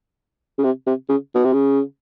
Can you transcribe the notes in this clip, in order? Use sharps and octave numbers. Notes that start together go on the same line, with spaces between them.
C#3
C3
C3
C#3
B2
C3
C#3